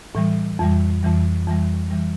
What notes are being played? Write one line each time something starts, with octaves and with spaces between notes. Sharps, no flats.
A2 E3 G3
F2 E3 G3
F2 E3 G3
F2 E3 G3
E3 G3